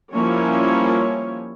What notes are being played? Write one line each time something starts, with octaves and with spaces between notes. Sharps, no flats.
F3 G3 A#3 C#4 E4 C#5